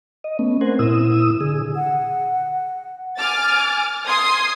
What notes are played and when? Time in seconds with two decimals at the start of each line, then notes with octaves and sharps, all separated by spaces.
0.24 D#5
0.39 A3 B3 C#4
0.61 C4 A#4 C5 F#5 G#5
0.79 A#2 E4 D#6 E6
1.41 D3 G#4
1.76 F#5
3.18 G#5 D6 F6 A6
4.05 C6 D#6 G#6 C7